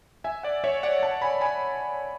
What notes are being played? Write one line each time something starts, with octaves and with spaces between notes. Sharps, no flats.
E5 G#5
D5 F#5
C#5 E5
D5 F#5
F#5 A5
G#5 B5
G#5 B5